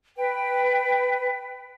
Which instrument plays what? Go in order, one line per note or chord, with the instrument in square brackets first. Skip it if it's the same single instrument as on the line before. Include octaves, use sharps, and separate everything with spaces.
[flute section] B4 G5